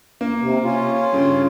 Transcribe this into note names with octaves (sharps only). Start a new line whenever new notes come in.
A#3
C3
C#4 F4
G2 C#3